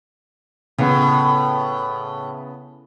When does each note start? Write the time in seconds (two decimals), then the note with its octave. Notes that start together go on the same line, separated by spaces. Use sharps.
0.78 A2 C#3 B3